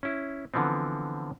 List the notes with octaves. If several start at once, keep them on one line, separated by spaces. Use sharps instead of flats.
C#4 E4
D3 E3 F3 B3 C4